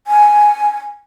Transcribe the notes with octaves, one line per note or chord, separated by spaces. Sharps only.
G#5